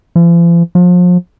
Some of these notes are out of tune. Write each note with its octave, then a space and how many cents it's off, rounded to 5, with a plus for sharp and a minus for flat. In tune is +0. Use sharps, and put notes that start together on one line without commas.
F3 -45
F3 +35